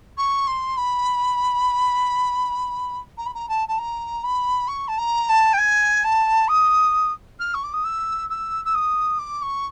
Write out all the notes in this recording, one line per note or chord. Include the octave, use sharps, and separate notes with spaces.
C#6
C6
B5
A#5
B5
A#5
A5
A5
A#5
B5
C#6
A5
A#5
A5
G5
G#5
A5
D#6
F6
C#6
D6
D#6
E6
E6
E6
D#6
D6
C#6